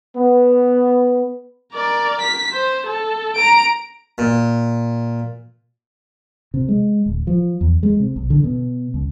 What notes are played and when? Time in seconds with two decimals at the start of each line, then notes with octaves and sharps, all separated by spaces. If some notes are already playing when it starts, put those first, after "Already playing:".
0.16 B3
1.73 A#4 D5
2.21 B6
2.53 C5
2.87 A4
3.36 A#5 D7
4.18 A#2
6.54 C3
6.69 G#3
7.06 D1
7.27 F3
7.61 E2
7.83 G#3
8.00 C3
8.16 B1
8.30 D3
8.44 B2
8.94 C#2